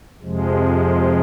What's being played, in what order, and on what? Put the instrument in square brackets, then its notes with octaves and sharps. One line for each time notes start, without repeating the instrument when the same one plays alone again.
[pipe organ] F2 C3 F3 G#3